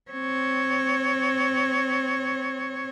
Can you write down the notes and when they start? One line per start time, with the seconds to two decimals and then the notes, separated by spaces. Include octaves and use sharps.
0.11 C4 C#5